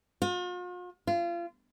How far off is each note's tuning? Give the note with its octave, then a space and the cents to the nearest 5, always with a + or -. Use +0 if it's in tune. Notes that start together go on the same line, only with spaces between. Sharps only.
F4 +45
F4 -30